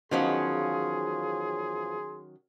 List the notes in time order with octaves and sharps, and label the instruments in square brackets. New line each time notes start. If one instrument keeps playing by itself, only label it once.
[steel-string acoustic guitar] E2 F3 F5 [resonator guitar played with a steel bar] D#3 F#3 C#4 [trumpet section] G#4 C6